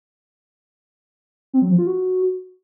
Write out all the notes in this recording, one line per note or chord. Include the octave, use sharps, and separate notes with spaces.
C4
F#3
F3
F4
F#4